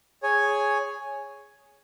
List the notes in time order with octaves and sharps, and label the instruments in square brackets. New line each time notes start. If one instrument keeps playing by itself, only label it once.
[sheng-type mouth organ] G#4 C#5 G#5